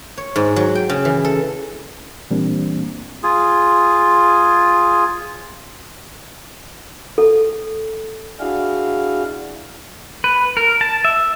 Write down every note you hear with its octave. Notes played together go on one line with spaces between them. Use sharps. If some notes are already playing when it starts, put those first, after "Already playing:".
C#5
G#2
F#3
G5
C#3
E3
A4
A#2 E3 G3 A#3 C4 D4
F4 G#4
A4
D4 E4 F#4 G#4 F5
B4
A#4
A5
E5